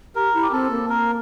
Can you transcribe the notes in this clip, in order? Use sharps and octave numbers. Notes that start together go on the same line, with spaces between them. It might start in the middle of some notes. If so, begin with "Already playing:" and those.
G4 A#4
E4
G4
C4 A4
A#3
A#4